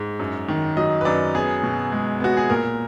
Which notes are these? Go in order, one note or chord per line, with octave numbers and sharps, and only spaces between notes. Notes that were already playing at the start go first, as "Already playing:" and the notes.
Already playing: G#2
F#2
D#3
F#3 D#5
B4
F#2 D5
B3 G#4
B2
G#3
B3 F#4
G#4
A#2 A#4